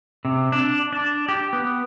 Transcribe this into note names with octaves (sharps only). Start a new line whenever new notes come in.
C3
D4
D4
G4
B3